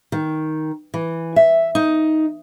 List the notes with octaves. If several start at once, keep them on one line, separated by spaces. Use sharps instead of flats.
D#3
E3
E5
D#4